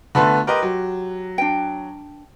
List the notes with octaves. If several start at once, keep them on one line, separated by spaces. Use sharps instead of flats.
D3 A3 B3 F4 A5 B5
F4 G4 A#4 B4 D#5
F#3
D4 G5